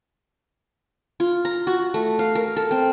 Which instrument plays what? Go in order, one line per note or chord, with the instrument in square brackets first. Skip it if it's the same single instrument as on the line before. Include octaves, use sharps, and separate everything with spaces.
[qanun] F4
A#5
F#4
A3
F5
A#4
A4
C4